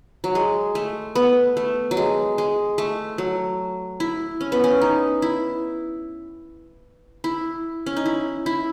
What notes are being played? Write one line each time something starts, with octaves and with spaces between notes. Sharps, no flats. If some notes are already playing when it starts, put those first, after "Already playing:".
F#3
G#3
A3
B3
A3
F#3
G#3
G#3
A3
F#3
E4
C#4
B3
C#4
D#4
E4
E4
C#4
D#4
E4
E4